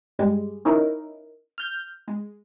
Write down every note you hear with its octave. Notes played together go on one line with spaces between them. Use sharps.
G2 G3 G#3
C#4 D#4 E4 A#4
F6 G6
G#3